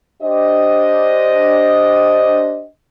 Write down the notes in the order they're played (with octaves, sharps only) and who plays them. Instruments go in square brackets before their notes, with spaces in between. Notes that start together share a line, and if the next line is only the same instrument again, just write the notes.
[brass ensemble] D4 G4 C5 D#5